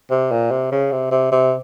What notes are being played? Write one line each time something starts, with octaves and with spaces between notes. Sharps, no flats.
C3
A#2
C3
C#3
C3
C3
C3